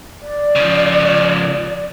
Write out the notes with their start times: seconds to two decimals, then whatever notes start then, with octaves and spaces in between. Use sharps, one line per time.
0.22 D5
0.55 C#3 F3